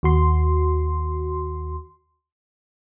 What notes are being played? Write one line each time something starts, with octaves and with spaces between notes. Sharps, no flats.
D#2 F#4 C6